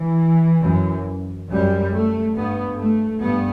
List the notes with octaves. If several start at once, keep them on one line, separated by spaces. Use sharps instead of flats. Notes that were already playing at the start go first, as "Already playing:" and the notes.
Already playing: E3
F#2
F#2 G3
A3
G2 B3
A3
G2 B3